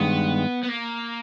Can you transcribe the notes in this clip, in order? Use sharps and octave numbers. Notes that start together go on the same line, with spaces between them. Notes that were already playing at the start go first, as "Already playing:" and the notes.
Already playing: G2 D#3 G#3 B3
B3
A#3